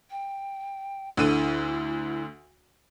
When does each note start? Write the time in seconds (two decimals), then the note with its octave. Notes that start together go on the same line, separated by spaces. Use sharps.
0.11 G5
1.17 D2 D3 E4 D#7